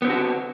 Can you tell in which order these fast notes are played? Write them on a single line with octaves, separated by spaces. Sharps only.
B3 C4 D3 F#4